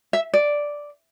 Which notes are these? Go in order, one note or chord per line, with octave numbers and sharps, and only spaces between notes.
E5
D5